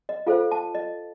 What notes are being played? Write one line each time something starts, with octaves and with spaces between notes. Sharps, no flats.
D#5
F4 A4 C5 F5
A5
D#5